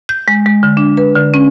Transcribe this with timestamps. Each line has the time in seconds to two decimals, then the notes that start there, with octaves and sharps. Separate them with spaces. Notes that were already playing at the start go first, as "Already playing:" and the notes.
0.09 G6
0.28 G#3
0.46 G#3
0.63 D3
0.77 D4
0.97 B4
1.15 D3
1.34 C#4